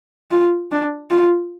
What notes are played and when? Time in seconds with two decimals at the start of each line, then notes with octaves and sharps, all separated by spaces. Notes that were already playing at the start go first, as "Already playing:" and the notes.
0.31 F4
0.71 D4
1.10 F4